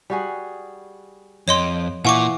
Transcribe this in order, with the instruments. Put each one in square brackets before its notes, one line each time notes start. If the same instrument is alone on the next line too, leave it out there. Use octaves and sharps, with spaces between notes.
[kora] G3 F#4 G#4
[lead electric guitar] F2 [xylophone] C#5 D#5 C6
[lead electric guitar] A#2 [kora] E3 F5 [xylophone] F#5 C#6 D6